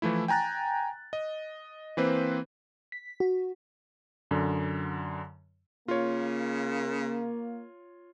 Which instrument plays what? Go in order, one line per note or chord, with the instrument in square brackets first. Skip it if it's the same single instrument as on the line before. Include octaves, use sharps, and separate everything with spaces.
[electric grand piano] E3 F3 A3 E4
G5 G#5 A#5 F#6 A6
D#5
E3 A#3 C4 B4 C5
[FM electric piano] B6
F#4
[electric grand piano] F#2 D3
[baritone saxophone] C#3 [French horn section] A#3 [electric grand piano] F4 C#5